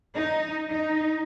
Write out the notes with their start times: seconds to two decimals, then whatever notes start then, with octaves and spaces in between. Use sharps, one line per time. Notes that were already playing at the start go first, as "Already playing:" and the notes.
0.15 D#4
0.70 D#4